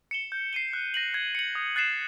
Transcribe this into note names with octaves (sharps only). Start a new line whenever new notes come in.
C#7 E7 G7
G6
C7 D#7 G7
F#6
A#6 D#7 F#7
G#6
C#7 F#7
D#6
F#6 A6 C7 E7